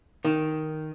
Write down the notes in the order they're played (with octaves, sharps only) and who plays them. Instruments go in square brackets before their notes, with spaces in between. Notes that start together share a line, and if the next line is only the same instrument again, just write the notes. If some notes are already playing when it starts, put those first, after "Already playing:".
[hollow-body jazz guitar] D#3